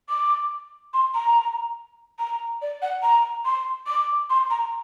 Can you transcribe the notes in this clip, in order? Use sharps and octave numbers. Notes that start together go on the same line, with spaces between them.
D6
C6
A#5
A#5
D5
F#5
A#5
C6
D6
C6
A#5